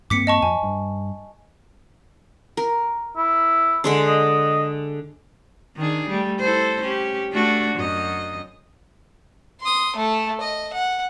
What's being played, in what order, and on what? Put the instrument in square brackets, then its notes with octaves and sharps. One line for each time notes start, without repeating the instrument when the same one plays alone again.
[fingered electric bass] G2 A#3 C4 [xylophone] D6 B6 C#7
[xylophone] D#5 A5 C#6
[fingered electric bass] F2 [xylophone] G#5
[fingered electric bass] G2
[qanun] A#4
[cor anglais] E4
[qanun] D3 G#3 D4
[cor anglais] D#5
[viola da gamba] D#3 D4 G#4
G3 A3
E4 A4 C5
C#4 G4
A3 D4 F#4
F#2 D#5
[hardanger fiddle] C6 D#6
A3 A4
D#5
F#5